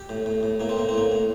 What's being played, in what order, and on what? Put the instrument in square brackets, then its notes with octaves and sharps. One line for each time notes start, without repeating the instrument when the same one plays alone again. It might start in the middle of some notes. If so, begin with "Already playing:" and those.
Already playing: [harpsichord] G4
A2
A2
A2
A2 A#3
C4
A2 A#3
C4
A2 A#3
A2